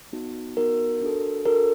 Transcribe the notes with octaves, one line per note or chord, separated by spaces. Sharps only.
B3 D#4 F#4
B3 D#4 F#4 A#4
D4 F#4 A4
D4 F#4 A4 A#4